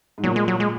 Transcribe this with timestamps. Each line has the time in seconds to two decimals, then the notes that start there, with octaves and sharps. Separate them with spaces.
0.18 G#2
0.23 A#2 F#3
0.36 G#3
0.48 F#3
0.60 G#3